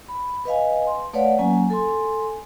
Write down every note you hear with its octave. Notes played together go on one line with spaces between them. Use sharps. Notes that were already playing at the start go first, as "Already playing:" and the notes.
B5
B4 D#5 F5 G#5
C6
A3 B4 C#5 D5 F5 F#5
F#3 A#3 C#4 G#5
A4 G#5 C6